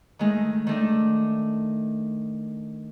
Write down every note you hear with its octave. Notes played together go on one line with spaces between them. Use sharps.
D#3 G#3 A3
D#3 A3 D4